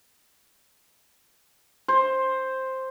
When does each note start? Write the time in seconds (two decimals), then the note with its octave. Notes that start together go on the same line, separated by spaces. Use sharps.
1.88 C5